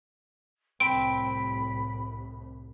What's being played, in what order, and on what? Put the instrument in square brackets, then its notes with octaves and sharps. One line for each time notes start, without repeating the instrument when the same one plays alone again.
[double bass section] C2 A2 [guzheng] C4 [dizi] B5 [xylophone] D7